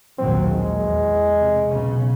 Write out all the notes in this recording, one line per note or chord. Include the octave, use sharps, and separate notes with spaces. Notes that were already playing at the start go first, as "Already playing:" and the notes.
A#1 D#2 F#3 C4
G#3
E2
C3
B1 C#3 C#4